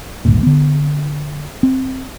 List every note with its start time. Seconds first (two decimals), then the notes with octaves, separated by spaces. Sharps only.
0.25 G#1 D2 G2 A#2
0.43 D3 B3
1.63 C4